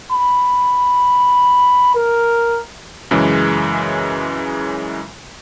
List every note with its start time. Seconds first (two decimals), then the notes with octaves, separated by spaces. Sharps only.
0.12 B5
1.95 A#4
3.11 F#2 C#3 E3 G#3